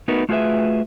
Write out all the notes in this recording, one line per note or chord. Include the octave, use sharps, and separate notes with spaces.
A3 B3 D#4 F#4 A#4 B4
A3 F4 F#4 G#4 B4 E5